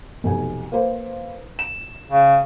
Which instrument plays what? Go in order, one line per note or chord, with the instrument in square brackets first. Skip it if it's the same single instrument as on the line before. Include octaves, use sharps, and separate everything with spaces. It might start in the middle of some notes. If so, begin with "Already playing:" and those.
[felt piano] F1 B1 G#5
A#3 B4 C5
E7
[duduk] C#3